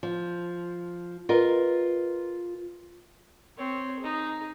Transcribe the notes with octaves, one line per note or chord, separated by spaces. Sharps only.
F3
F4 G#4 A#4 B4 D#5
C4 C#5
D#4 G#4